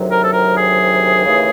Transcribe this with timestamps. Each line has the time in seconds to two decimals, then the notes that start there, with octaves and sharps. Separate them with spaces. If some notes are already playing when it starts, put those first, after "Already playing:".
Already playing: D2 C3 D#3 F#3
0.09 A#4
0.23 A4
0.32 A#4
0.55 G#4
1.25 D#2 C#3 E3 A3